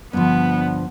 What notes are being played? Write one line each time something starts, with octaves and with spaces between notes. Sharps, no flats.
G2 D3 F3 B3